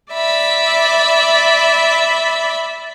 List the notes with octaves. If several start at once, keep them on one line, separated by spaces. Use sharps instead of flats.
D5 E5 B5